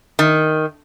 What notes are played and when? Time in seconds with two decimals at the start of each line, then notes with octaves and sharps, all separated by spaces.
0.19 D#3